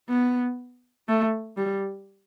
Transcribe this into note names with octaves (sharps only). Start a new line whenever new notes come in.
B3
A3
G3